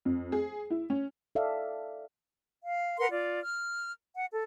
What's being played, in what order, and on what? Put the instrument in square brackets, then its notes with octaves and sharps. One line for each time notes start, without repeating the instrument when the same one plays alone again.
[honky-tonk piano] F2
G#4
E4
C#4
[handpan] A4 D5 E5 F5
[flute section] F5
A#4 B4 F#5 C6
F4 D5
F6
F#5
A4